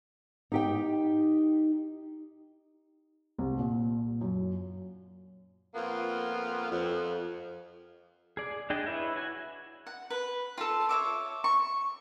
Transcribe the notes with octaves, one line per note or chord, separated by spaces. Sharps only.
D#4 G4 G5
C2
A#2
F#2
F2 A#3 B3 F4
F2
G#4 D5
D4 G#4 D5 D#5 G5
E4 B4 C#5 E5
F#4 G#5
F#5
B4
F4 A4
C#5 E5 D6
C#6